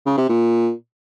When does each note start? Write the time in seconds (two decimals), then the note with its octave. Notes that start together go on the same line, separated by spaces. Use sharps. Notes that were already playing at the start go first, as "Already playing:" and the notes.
0.06 C#3
0.18 C3
0.29 A#2